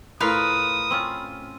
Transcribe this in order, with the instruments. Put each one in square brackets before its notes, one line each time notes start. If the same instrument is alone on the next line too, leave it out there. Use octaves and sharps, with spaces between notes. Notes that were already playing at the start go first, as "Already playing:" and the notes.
[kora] A2 F4 [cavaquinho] A#4 B4 F5 [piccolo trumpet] D#6
[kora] C4 C#4 F4